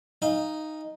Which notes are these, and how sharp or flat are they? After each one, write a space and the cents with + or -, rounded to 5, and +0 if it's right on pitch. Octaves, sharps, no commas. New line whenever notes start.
D#4 +0 F5 -20 G#5 -35